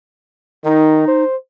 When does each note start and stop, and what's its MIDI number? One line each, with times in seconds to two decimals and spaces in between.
0.64 1.06 51
0.64 1.23 63
1.08 1.36 72